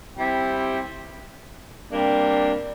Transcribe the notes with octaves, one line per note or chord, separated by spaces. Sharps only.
G3 C4 E4 G4
C3 G3 A#3 D4 G4